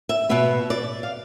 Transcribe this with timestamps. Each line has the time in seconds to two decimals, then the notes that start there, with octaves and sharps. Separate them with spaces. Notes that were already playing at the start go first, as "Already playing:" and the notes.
0.09 E5
0.29 B2 B3 E5
0.70 D5
1.03 F5